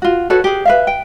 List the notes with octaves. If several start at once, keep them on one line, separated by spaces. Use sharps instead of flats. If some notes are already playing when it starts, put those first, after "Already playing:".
F4 F#4
F#4 A4 B4 C#5
G4 G#4
B4 E5 F5
G5